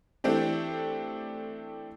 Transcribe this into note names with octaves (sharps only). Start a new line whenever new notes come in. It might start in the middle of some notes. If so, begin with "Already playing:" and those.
E3 A3 C4 D4 G4